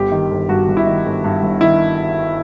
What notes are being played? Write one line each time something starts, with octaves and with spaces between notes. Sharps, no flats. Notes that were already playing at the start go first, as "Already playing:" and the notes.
Already playing: G1 G4
D#3
G1
G2 F#4
G1
E4
D#3
G1
G2
G1
D#3 E4